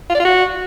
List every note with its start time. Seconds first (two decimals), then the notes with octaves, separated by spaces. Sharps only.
0.10 F4
0.15 D5
0.20 F4
0.25 F#4